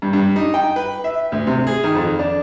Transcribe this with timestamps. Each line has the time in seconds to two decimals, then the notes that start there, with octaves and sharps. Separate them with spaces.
0.02 G2
0.13 G2
0.36 D#4
0.54 G5
0.76 B4
1.04 E5
1.32 D2
1.47 C3
1.67 G#4
1.83 D#3
1.95 F2
2.19 D4